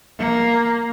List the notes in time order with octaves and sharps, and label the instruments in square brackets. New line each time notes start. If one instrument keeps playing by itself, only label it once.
[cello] A#3